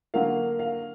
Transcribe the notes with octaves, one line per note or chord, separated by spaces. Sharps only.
D3 F#3 A#3 F5
F5